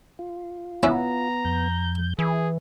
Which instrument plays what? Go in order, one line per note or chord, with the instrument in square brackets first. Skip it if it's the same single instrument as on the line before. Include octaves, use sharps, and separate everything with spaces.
[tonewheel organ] F4
[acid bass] B3 [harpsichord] C#4 E4 [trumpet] A#5
[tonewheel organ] F2 G6
[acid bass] E3 [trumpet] G#4